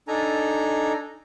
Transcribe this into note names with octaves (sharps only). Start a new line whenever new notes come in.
D4 D#4 A4 G#5 A#5